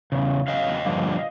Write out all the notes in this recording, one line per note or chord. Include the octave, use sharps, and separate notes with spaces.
E2 C#3
E2 C#3 F#3 D#5 F5
G2 D3 F3 A#3